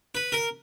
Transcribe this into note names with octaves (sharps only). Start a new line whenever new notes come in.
B4
A#4